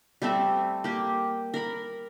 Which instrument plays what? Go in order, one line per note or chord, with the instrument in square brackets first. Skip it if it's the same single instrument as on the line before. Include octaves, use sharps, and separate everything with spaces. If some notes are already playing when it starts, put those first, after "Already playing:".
[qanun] G3 A3 C4 E5
A#3 G4
A#4 B5